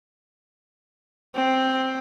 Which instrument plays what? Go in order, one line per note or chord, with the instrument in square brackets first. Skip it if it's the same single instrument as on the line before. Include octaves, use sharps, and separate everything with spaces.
[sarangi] C4